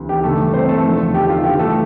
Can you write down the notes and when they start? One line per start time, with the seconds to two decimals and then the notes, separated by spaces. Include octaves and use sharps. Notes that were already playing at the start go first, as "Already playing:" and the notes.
Already playing: D2 C3 E3
0.09 G4
0.23 G2 E3 A3 A4
0.54 C4 C5
0.69 A3 A4
0.83 E2 D3 F3
1.14 G4
1.29 F4
1.44 G2 E3 G4
1.59 A3 A4